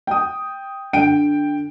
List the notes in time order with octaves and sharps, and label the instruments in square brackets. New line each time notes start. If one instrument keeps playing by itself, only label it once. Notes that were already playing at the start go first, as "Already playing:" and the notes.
[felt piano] G5 D#6
D3 G5 D7